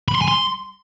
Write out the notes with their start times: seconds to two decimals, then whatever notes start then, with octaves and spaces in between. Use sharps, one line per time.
0.08 B5
0.15 C6
0.22 G#5
0.28 C6